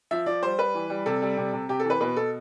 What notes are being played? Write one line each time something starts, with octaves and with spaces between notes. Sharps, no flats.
F3 E5
F3 D5
G3 C5
G3 B4
E3
G3
C3 A4
G3
C3
C3
C3 G4
A4
E3
B4
B2 B4
B2 A4